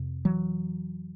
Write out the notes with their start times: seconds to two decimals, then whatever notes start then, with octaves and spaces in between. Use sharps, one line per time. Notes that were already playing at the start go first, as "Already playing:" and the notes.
Already playing: F2 C3
0.25 E3 F#3